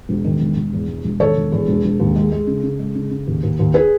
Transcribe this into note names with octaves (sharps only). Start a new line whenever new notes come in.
E1
D#3
E1
E1
E2
E1
E1
D#3 A4 C#5
E1
E2
E1
E1
D#2
G#3
G#3
C#3
C#3
G#3
C#3
C#3
D#2
D#2
D#2
G#4 B4